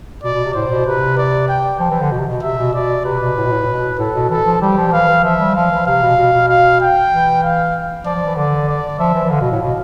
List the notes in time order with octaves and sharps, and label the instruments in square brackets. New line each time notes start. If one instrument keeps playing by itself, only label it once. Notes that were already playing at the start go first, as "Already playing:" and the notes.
[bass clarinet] B2 [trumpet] D5
[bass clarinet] B2
C3
[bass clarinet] A2 [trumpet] C5
[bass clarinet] B2
[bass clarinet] C3 [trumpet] B4
[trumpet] D5
G5
[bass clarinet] F3 [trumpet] G5
[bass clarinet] E3
D3
B2
C3
B2
[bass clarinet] C3 [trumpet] E5
[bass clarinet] B2
[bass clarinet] B2 [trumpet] D5
[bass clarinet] C3 [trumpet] B4
[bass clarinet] B2
A2
B2
A2
B2
[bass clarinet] A2 [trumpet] A4
[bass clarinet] B2
[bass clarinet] E3 [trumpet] A4
[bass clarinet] F3
[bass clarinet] G3 [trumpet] G4
[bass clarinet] F3
F3
[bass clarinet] E3 [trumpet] F5
[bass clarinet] E3
[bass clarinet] F3 [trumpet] E5
[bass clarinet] G3
[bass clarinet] F3 [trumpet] F5
[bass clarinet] E3
[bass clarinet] C3 [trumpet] F5
[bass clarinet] B2
B2
B2
[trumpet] F5
G5
[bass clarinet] E3
[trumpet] F5
[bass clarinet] F3 [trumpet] D5
[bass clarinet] F3
E3
[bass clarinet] D3 [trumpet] D5
[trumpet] D5
[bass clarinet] F3 [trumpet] E5
[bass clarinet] E3
E3
[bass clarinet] D3 [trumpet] F5
[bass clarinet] B2
A2
B2